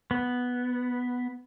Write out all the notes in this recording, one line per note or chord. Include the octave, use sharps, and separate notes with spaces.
B3